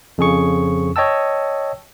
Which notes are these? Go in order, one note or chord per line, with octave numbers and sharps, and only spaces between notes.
F2 C#3 G#4 C#6
C#5 D#5 G5 A5 E6